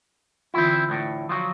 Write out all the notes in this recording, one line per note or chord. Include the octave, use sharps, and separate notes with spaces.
D3 E3 C4 E4 F4
D2 A2
F3 F#3